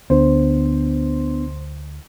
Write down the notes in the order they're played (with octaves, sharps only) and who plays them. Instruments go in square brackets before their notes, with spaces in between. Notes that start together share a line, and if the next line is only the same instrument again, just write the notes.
[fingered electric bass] D2 [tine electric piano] B3 D4 [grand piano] C5